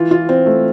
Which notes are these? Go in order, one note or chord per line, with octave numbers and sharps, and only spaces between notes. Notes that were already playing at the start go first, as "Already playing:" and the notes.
Already playing: E3 F4
F4
C4
A3